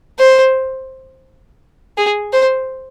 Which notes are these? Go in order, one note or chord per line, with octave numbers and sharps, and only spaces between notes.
C5
G#4
C5